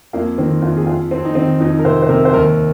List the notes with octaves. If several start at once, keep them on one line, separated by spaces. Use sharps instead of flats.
F2 A#3
D#3 C4
F2 F4
G#4
F2 F4
F2 C4
D#4
D#3 C4
F2 D#4
A#4
C3 C5
C5
C3 A#4
C5
D#2 A#4